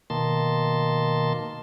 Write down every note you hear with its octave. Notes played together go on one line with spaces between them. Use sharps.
B2 D#3 A#3 A5 C6